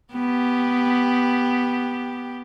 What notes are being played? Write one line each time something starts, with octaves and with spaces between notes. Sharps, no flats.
B3 G4